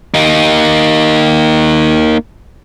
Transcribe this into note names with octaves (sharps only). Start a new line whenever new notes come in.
A#3 D#4